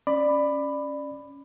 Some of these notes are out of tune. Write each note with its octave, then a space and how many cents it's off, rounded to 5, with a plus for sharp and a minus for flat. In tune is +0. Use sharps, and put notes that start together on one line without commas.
C#4 +0 D5 +20 B5 +10